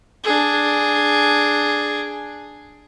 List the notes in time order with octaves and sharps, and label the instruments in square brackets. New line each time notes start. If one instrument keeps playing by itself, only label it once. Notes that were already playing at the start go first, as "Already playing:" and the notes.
[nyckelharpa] D4 G#4